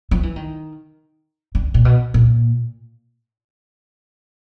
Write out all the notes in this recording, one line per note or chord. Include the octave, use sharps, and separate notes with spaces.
F3
E3
D#3
D3
A#2
B2
A#2